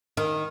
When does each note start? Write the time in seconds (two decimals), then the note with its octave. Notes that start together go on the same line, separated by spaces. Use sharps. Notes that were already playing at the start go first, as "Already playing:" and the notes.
0.17 D#3